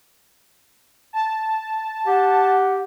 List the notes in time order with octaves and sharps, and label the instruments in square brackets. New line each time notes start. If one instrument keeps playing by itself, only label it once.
[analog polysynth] A5
[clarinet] G4 [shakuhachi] F#5